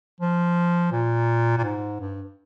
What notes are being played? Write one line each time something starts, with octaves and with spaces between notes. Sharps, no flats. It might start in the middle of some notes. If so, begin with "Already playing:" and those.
F3
A#2
A#2
G#2
G2